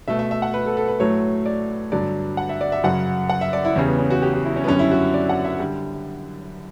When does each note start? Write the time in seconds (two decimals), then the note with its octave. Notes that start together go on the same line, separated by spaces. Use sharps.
0.08 B2 A3 E5
0.19 E5
0.31 E5
0.42 F#5
0.54 B4
0.65 A4
0.77 A4
0.88 B4
1.00 A2 F#3 A3 C#5
1.46 D5
1.92 G2 D3 F#3 D5
2.37 F#5
2.49 E5
2.61 D5
2.72 E5
2.84 F#2 C#3 F#3 F#5
3.30 F#5
3.41 E5
3.53 D5
3.65 E4
3.76 E2 C#3 G3 C#4
3.88 B3
3.99 C#4
4.10 F#4
4.22 G4
4.34 F#4
4.45 E4
4.56 C#4
4.64 B3
4.68 F#2 D3 G3 C#4
4.79 E4
4.91 F#4
5.14 D5
5.29 F#5
5.45 E5
5.60 D3 G3